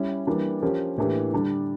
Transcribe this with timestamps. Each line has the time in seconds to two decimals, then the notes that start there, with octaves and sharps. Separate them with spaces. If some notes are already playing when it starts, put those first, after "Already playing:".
Already playing: G3 C#4 E4
0.27 E3 G3 A#3 D4
0.62 F3 C#4 G4 A#4
0.98 A2 E3 A#3 D4 G4
1.33 D3 G3 D4